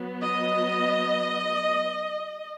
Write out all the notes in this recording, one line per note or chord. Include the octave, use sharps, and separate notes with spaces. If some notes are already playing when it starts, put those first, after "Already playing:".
Already playing: F#3 B3
D#5